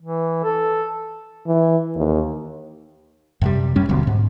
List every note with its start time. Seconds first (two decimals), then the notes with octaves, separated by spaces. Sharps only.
0.01 E3
0.44 A4
1.47 E3
1.96 D#2
3.42 F#2 C3 G3
3.76 F#2 G3 C#4
3.89 D#1 B1 B2 D3
4.07 G#2